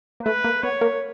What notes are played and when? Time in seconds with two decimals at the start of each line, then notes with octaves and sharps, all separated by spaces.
0.20 A#3
0.25 A3 B4
0.44 A#3
0.63 B3 C#5
0.81 A#3